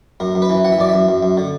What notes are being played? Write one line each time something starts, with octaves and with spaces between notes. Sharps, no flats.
F#2 A#4
F#2
B4
E3
E3 F#5
E5
F#2 D5
F#2 E5
F#2
F#2
D3